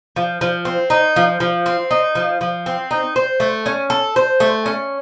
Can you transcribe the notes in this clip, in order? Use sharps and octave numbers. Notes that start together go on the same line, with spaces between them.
F3
F3
C4
D#4
F3
F3
C4
D#4
F3
F3
C4
D#4
C5
A3
C#4
A4
C5
A3
C#4